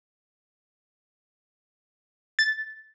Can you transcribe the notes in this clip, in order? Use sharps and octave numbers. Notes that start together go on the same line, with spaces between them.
A6